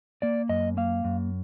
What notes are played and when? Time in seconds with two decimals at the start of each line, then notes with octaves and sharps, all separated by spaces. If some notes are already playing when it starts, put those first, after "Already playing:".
0.22 A#3 D5
0.49 F#2 D#5
0.77 A#3 F5
1.04 F#2